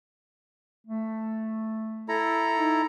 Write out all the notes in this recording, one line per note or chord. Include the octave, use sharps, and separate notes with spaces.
A3
E4 A4 A#5
D#4